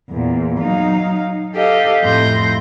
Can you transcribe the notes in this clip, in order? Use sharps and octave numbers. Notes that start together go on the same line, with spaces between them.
E2 A#2
F#3 D#4 F5
G4 A4 D#5 F5
F2 A2 A3 C6 G6 A#6